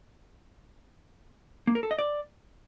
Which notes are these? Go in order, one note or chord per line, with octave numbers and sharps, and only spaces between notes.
A#3
A#4
A4
D#5
D5